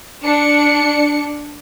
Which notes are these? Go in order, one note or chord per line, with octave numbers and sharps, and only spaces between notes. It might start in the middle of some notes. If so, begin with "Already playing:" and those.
D4 C#7